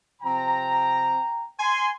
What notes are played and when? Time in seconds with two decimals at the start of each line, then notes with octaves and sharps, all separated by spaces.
0.22 C3 F3 C4 G5 A#5
1.60 G#5 C6